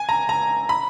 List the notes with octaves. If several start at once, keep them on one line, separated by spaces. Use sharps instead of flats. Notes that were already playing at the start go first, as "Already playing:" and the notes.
Already playing: G#5
A#5
A#5
B5